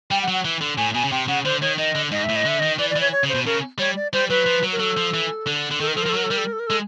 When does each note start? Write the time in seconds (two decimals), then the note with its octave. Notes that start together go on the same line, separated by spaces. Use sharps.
0.11 G3 G5
0.22 F#5
0.28 F#3
0.33 F#5
0.45 E3
0.61 D3
0.77 A2 G#5
0.94 B2 G#5
1.04 C#3
1.11 C3 G5
1.28 C#3 F#5
1.45 D3 C5
1.61 D#3 C#5
1.78 D#3 D#5
1.95 D3
2.11 G#2 D#5
2.24 E5
2.29 A2
2.36 D#5
2.45 D3 E5
2.60 D#3 D#5
2.78 E3 D5
2.90 D5
2.96 E3
3.01 C#5
3.12 C#5
3.23 C#3
3.29 C5
3.34 B2
3.46 C#3 A#4
3.79 G3 C#5
3.96 D5
4.13 G3 C5
4.29 F#3 B4
4.46 F3
4.63 F#3
4.73 A#4
4.79 F#3 A4
4.97 F3
5.14 E3
5.47 D3
5.71 D3
5.80 D#3 A4
5.88 A#4
5.95 F3 A4
6.02 A#4
6.06 F3
6.09 A4
6.13 F#3 A#4
6.24 A4
6.31 G3 A#4
6.38 A4
6.45 A#4
6.53 A4
6.60 A#4
6.67 G#3 A4